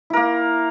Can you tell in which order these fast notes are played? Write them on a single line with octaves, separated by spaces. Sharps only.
E4 A#4 A#3